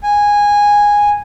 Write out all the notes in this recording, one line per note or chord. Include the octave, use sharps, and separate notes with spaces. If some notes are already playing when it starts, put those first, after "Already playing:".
G#5